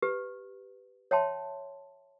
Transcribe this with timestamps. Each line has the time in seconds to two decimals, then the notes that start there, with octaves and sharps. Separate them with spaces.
0.02 G4 B4
1.11 C#5 E5 G5 A5 C6